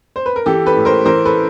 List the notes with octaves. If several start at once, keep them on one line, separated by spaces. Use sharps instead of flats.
C5
B4
A#4
E3 G4 A4
A4 B4
A2
A#4 C5
E3 A#4 C5
A4 B4